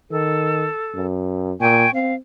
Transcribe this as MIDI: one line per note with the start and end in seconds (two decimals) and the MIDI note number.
0.11 0.66 51
0.11 1.08 69
0.95 1.52 42
1.60 1.85 46
1.60 1.90 79
1.60 1.90 80
1.60 1.90 85
1.93 2.16 60
1.93 2.15 77